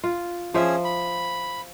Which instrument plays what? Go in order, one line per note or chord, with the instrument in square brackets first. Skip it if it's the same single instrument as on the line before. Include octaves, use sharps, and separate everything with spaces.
[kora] F4
[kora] F3 C5 E5 [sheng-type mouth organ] C#4 G#4
[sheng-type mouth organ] B5